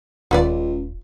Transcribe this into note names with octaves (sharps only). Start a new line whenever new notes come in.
D#1 C#2 F4 B4 D5